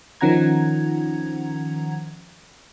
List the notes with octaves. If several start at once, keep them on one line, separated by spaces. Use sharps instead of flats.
D#3 F3 C#4 F#5 A#5 G#6